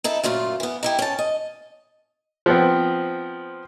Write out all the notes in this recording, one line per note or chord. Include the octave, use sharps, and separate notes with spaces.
D#4 E4 A4
F#2 A#2 A3 F4
E3 B3
D#4 E4 G4
C#4 A5
D#5
F3 B3 C4